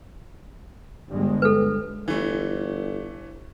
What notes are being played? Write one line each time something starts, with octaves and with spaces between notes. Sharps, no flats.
G1 G2 G#3
A4 B4
G1 E3 A3